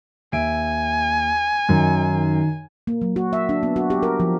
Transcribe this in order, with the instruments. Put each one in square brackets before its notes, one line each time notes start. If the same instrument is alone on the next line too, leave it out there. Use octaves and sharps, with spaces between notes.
[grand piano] D#2 E5 D7 [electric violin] G#5
[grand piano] F#2 [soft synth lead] D#3
[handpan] A#3
F#3
F#4
E5
D4
B3
F#4
G4
A#4
F3